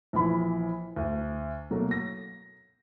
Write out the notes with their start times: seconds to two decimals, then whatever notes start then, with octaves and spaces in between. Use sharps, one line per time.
0.13 A#1 E3 B5
0.96 D2
1.70 B2 F#3 A3 A#3
1.91 A#6